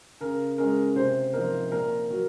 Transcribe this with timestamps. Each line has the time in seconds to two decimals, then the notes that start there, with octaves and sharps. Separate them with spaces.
0.21 C#3 A#4
0.58 G#3 C#4 A#4
0.96 C3 C5
1.33 F3 C4 D#4 A#4
1.71 A#2 A#4
2.09 F#3 A#3